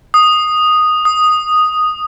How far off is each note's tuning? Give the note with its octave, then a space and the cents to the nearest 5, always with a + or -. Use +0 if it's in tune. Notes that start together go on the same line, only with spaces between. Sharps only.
D#6 -5
D#6 +0